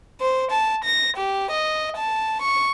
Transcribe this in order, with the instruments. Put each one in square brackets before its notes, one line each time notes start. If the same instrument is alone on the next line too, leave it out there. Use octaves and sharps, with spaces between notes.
[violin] C5
A5
A#6
G4
D#5
A5
C#6